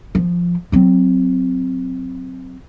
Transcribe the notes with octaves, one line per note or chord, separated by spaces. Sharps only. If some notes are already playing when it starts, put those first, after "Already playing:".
F3
F#3 C4